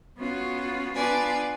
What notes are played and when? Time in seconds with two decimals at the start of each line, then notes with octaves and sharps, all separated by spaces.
0.18 B3 C#4 F4 F#4
0.95 B3 D4 F4 B4 D5 G#5